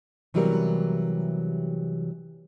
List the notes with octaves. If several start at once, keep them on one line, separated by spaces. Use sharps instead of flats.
C3 E3 F#3 G3 B3 A#4